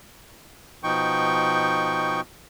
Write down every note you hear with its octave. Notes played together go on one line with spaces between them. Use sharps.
B2 F3 D#4 G5 C#6